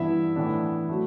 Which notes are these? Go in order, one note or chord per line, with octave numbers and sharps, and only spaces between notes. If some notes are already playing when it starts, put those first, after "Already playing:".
Already playing: G2 E3 B3 D4 E4 E5
A2 E3 B3 D4
F#3 A3